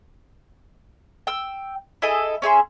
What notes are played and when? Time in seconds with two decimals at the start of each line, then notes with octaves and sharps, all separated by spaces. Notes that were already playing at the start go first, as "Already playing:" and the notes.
1.27 G5 E6
2.02 E4 G#4 A4 D#5
2.42 C#4 G#4 E5 C6